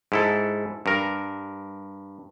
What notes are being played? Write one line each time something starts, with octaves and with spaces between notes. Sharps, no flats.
G#2 E4 A4
G2 A#4